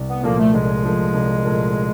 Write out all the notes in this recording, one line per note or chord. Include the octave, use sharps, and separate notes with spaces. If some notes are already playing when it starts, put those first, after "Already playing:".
Already playing: C2
B3
A#2 F3 A3 A#3
A3
C2 G#3
A#2 F3 A3
C2
A#2 F3 A3